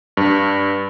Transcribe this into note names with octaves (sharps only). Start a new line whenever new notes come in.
G2